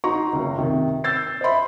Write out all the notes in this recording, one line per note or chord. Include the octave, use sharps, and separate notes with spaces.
D#4 F#4 A#5 C6 C#6
F#1 C#2
C3 D#3
E6 G6 A6 C7
C5 D#5 E5 B5 C6